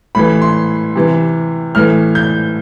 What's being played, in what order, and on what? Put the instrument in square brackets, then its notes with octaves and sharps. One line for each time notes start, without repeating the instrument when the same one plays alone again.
[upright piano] A2 E3 B5
C6
C3 E3
A2 E3 F6
G6